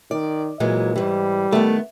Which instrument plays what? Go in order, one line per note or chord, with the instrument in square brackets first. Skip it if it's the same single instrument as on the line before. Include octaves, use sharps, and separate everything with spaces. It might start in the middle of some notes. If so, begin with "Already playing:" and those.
[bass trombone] D#3 [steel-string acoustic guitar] D5
[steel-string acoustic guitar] A#2 E3 G#3 [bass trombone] F#3
[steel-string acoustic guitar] G#2 E3 [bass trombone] G3
[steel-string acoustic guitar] D#3 B3 [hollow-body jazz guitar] A3